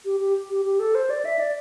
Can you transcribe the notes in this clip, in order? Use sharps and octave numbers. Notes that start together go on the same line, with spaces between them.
G4
G4
G4
G4
A4
C5
D5
E5
D5